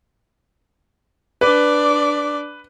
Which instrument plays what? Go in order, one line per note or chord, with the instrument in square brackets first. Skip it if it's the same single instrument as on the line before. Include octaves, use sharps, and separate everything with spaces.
[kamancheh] D4 D5 [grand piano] B4